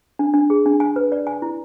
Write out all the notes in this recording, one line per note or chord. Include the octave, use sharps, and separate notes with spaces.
D4
D4
G#4
D4
G#5
B4
D5
G#5
E4